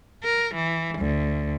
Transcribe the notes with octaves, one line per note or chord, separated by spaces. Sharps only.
A#4
E3
D2